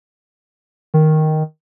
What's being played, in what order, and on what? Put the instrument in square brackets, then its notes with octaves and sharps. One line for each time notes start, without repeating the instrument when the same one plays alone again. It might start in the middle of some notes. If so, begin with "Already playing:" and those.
[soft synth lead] D#3